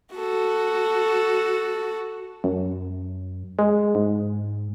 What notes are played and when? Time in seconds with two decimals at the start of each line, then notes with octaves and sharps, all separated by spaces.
0.15 F#4 A4
2.44 F#2
3.59 G#3
3.95 G#2